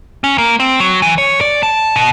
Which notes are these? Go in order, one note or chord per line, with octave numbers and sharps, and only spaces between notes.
C#4
A#3
C4
F#3
E3
C#5
D5
A5
B2